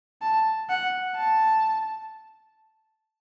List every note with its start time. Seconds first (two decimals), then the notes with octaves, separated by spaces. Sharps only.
0.22 A5
0.70 F#5
1.16 A5